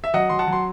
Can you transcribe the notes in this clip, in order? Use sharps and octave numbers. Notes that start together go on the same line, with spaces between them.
E5
F#3 D#5 F#5
F#3 C6
F#5 A5
F#3
C6